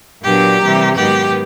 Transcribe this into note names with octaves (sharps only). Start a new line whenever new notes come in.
A#2 F#3 B3 D4 G4
C3 E3 G3 A#3
G#2 D#3 F#3 B3 G4